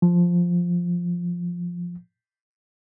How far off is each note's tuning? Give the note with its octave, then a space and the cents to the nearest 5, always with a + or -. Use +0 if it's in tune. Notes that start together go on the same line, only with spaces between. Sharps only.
F3 +0